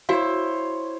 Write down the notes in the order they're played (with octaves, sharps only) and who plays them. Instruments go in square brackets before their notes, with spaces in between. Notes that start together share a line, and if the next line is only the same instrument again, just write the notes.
[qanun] E4 [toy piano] F#4 F5 [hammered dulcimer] C5 C#5